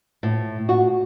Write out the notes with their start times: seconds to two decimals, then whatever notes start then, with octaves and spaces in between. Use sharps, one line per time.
0.23 A2
0.69 F#4